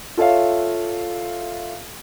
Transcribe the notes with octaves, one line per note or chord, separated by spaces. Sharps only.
F4 A4 C#5 E5 F5